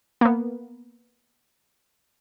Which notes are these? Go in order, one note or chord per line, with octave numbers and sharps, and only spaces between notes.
A#3 B3